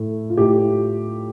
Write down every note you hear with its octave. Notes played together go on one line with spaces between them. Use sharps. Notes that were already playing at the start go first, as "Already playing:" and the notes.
Already playing: A2 A3
F4
A2 A3 G4